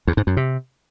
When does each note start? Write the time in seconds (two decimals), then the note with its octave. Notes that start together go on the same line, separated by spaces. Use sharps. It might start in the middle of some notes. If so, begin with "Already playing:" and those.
0.07 E2
0.17 G#2
0.27 F#2
0.37 C3